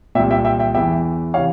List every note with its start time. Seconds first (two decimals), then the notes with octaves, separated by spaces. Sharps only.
0.15 A#2 E5 G5
0.20 C2
0.30 E5 G5
0.45 E5 G5
0.59 E5 G5
0.74 E2 E3 E5 G5
1.34 C3 E3 C#5 F5